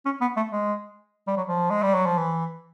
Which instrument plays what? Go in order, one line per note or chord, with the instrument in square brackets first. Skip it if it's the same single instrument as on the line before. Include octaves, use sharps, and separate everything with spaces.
[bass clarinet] C#4
B3
A3
G#3
G3
F#3
F3
G#3
G3
F#3
F3
E3